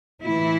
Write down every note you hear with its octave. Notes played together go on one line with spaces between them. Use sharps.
A2 E3 E4